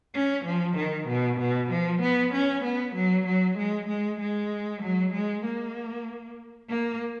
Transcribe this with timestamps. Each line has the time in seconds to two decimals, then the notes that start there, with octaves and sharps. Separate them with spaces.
0.14 C#4
0.45 F3
0.77 D#3
1.08 B2
1.40 B2
1.71 F3
2.02 B3
2.33 C#4
2.64 B3
2.95 F#3
3.27 F#3
3.58 G#3
3.88 G#3
4.20 G#3
4.82 F#3
5.14 G#3
5.45 A#3
6.70 A#3